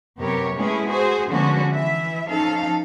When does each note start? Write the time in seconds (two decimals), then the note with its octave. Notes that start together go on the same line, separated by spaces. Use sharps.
0.19 F#2 C3 B3 G4 A#4 C#5
0.55 G#3 A3 B3 C#4 E4 G#4
0.89 F#4 G#4 C5
1.28 D3 F3 G#3 B3 C#4 F#4
1.74 E3 E5
2.27 F3 C#4 D#4 A4 F5